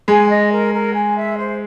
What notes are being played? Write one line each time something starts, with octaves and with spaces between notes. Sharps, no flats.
G#3 G#5
D#5
A#4
A#4
G#5
E5
C5